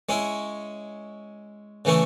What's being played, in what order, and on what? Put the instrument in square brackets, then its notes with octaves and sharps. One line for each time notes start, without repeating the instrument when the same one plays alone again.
[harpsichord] G#3 C#4 E4
C#3 E3 A3 C#4 E4